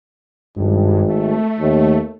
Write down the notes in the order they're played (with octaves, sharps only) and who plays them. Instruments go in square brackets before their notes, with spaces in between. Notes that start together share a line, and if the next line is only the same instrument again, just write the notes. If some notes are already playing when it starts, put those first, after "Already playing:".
[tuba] G#1 [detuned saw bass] G2
[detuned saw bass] A3
[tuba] D#2